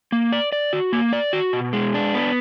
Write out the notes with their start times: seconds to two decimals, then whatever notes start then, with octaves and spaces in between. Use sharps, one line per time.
0.12 A#3
0.33 D5
0.52 D5
0.73 F#4
0.93 A#3
1.13 D5
1.33 F#4
1.53 B2
1.73 G#3
1.94 D4
2.14 B3